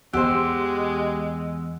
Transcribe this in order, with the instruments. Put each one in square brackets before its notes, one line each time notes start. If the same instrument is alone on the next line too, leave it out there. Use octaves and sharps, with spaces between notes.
[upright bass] E2 [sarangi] G#3 [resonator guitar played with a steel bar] G4 C5 [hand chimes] F#5 E6 F#6